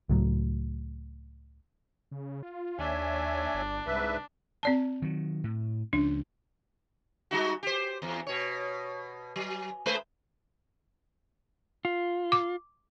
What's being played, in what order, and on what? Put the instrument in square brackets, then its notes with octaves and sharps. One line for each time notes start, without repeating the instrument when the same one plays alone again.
[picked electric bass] C#2 A2 F#3
[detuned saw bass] C#3
F4
[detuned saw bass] D#2 [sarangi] D4 [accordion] C#5 E5 G#5
[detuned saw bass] G1
[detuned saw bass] C2 [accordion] G#2 B4 E5
[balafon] C4 D5 A5
[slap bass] D#3 F#3
A2
[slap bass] C#2 F3 C#4 [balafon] D4
[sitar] G3 D#4 F#4
G4 C5
E2
B2 C#5
F#3
G#3 B4 C5
[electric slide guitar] F4
[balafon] D6